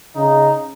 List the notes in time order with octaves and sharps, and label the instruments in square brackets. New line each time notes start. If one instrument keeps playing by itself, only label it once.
[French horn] C#3 [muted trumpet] D#4